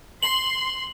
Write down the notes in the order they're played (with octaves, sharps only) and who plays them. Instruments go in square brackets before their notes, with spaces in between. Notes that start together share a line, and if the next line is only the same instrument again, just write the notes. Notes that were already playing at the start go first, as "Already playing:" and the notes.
[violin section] C6 [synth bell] F#7